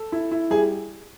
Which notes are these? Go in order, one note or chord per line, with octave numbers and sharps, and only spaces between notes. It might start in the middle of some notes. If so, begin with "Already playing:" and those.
Already playing: A4
E4
E4
G3 G#4